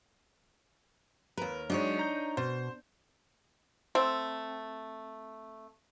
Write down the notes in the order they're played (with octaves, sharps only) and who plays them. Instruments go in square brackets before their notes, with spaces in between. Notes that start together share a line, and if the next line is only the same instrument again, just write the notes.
[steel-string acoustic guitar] D#2 A#4 [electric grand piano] B4
[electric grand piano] F#3 G#3 [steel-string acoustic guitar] D4 D#4 C#5
[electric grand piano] A#5 G6
[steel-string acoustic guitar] B2 [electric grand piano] C5
[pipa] A3 C4